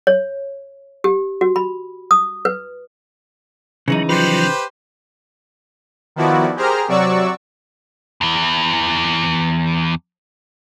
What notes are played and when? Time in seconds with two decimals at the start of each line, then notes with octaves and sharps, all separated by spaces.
0.07 C#5
1.04 G4
1.41 F#4
1.56 B5
2.11 D#6
2.45 B4
3.88 C#3 E3 F#3 D#4
4.09 F3 F#3 F4 G4 B4 C5
6.16 D#3 F3 B3 E4 F#4 D5
6.56 G4 G#4 A#4 C5 A#5 F6
6.88 C3 F#3 F#4 D5 C#6 E6
8.21 E2 E3